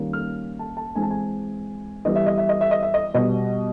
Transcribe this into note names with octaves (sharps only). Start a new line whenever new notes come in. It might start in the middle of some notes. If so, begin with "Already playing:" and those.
Already playing: D#3 G3 A#3 C#4
F6
A5
A5
E3 G#3 C4 G#5
A5
G#5
E3 G3 B3 D#5
E5
D#5
E5
D#5
E5
D#5
E5
D#5
B2 G3 B3 D#5